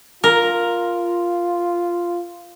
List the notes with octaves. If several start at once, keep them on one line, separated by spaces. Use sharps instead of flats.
F4 A#4